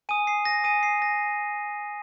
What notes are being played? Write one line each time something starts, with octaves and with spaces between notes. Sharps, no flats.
G#5 D#6 D#7
C7
A#6
G#5 D#6 D#7
C7
A#6